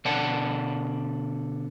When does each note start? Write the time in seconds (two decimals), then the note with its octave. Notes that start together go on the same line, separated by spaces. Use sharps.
0.05 B2 D3 D5 F#5 A5